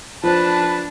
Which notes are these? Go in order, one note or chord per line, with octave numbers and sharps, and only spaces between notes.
F3 D4 B4 A5